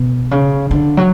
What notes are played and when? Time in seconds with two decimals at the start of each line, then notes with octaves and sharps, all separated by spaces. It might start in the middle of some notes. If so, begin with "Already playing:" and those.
Already playing: B2
0.31 C#3
0.71 D3
0.97 F#3